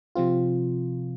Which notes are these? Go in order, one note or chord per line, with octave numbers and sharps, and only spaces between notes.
C3 F3 C4 F4